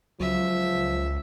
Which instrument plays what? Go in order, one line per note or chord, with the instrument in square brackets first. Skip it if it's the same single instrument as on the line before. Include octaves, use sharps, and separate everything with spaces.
[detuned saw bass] C#2 [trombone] F3 [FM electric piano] F#3 [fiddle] E5